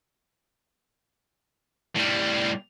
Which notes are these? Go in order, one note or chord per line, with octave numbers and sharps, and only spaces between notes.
A2 G3